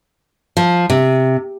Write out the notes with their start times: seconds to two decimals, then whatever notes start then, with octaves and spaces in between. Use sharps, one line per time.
0.57 F3
0.90 C3